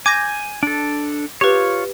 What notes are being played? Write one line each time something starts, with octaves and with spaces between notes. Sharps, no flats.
G#5 D6 G6 A#6
D4 A4
F4 G4 B4 C#5